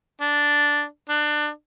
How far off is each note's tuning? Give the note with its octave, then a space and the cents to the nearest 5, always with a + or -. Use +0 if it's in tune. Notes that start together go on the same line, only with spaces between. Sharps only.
D4 -5
D4 +25